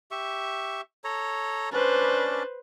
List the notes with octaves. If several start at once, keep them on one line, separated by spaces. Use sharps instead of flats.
G4 E5 C#6
A4 C#5 A#5
C#4 D4 B4 C5 D5